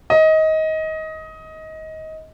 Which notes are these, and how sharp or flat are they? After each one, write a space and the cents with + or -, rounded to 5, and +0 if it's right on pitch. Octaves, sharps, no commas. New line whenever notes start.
D#5 +20